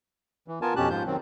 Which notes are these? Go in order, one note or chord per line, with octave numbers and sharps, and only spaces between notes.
E3
B3 F4 A#4 G#5 A5
F2 B2 C#4 G4 A5 F#6
G#2 F3 F4 C5 G6
D#3 F#3 C4